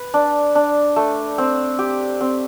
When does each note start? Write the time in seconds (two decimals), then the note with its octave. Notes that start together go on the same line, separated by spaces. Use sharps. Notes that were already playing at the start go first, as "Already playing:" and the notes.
Already playing: B4
0.14 D4
0.55 D4
0.96 A3
1.38 C4
1.79 G4
2.21 C4